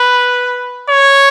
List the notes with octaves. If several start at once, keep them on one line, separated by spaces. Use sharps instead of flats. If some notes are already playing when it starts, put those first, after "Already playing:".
Already playing: B4
C#5